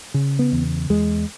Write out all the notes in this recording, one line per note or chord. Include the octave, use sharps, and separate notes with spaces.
C#3
B3
E2
E2 G#3